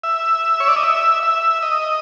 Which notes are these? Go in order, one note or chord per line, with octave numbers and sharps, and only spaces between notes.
E5
C#5
D5
D#5
E5
E5
D#5